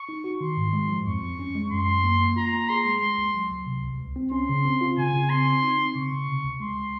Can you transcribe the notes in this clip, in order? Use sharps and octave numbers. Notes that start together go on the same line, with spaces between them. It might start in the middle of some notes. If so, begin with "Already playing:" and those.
Already playing: C#6
D#4
F#4
D#3 C6
G#2
G#3
F3
F2 C#6
F2
C#4
G#3
F#2 C6
F#2
A#3
A#3
F4 A#5
A#3
G#4 C6
G#3
G#3
C#2
F#3
C#2
C3
C2
C#2
C4
C#4 C6
C#3
C4
F4
C#3 G#5
C#3
C4 C6
C4
D#4
C4
C#3 C#6
C#3
C3
C#2
G#3 C6